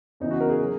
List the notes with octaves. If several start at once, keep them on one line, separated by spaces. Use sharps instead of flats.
E2 C#3 E3 D#4
F#4
A#4
G#4
F#3